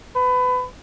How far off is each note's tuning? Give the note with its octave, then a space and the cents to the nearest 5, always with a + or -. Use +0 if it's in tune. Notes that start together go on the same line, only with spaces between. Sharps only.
B4 +25